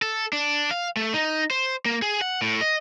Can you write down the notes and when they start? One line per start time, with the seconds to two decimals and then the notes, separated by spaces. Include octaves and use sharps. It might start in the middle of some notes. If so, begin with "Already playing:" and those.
0.02 A4
0.33 D4
0.71 F5
0.97 A3
1.14 D#4
1.51 C5
1.85 A#3
2.02 G#4
2.21 F#5
2.42 A2
2.61 D#5